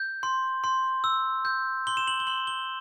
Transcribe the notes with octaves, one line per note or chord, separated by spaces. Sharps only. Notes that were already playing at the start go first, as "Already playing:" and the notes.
Already playing: G6
C6
C6
E6
G6
C6 G7
E7
F#7
G7
C6 F#7
G7